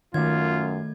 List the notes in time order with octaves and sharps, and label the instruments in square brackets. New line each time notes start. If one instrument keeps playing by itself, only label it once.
[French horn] F#2 [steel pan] D#3 [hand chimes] A3 G#6 [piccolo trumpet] F4